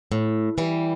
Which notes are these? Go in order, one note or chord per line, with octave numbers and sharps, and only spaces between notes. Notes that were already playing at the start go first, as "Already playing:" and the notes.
A2
E3 G3